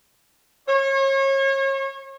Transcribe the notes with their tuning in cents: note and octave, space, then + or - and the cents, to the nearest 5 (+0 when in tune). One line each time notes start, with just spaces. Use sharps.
C#5 -35